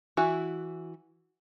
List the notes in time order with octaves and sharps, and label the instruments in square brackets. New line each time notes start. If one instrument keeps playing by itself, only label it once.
[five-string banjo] E3 E4 F#4